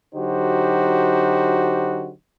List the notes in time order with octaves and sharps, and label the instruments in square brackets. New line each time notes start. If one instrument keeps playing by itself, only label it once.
[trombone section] D3 F#3 D#4 F#4 G4 C5